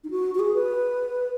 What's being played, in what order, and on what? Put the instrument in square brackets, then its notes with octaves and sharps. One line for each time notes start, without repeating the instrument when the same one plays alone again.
[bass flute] D#4
F#4
F#4
G#4
B4